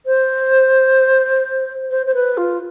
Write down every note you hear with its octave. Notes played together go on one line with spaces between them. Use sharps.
C5
C5
C5
B4
F4